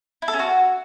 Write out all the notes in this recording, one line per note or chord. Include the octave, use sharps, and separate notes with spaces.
E4
A4
C#4
F#4